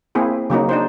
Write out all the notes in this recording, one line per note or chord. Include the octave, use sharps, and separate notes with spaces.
A#3 C4 E4 G#4
C#3 F#3 A#3 D#4
D4 D#4 C5